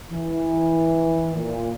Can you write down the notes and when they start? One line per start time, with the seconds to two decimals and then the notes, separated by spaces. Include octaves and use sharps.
0.11 E3
1.34 A#2